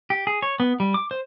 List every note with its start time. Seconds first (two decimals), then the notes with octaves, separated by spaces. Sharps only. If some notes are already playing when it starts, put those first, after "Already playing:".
0.10 G4
0.27 G#4
0.42 C#5
0.60 B3
0.80 G3
0.94 D6
1.11 C5